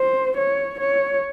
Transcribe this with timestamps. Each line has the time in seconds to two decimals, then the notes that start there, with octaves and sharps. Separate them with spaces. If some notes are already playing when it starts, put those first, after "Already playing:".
Already playing: C5
0.38 C#5
0.80 C#5